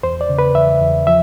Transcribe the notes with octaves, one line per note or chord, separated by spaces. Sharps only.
E2 C5
D5
C#3
B4
E2 E5
E2
F3 E5